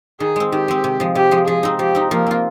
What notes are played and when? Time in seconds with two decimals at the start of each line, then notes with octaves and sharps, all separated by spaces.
0.20 D#3 G#4
0.36 G#3 C4
0.52 D#3 G4
0.68 G#3 C4
0.84 C3
1.00 F3 G#3
1.15 C3 G4
1.31 F3 G#3
1.47 F3 G#4
1.63 C4 D#4
1.79 F3 G4
1.95 C4 D#4
2.11 F3 A#3
2.27 C4 F4